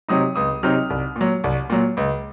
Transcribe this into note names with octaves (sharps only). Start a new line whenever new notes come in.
C3 F#3 C4 D#4 D#6
C#2 D#6
C3 F#3 C4 D#4 F6
C2
A#2 F#3
C2
A#2 F#3
C#2